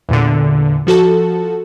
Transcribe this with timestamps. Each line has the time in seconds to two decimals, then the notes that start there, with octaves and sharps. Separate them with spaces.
0.09 E2 A#2 D3
0.87 F3 F#4 A4 A5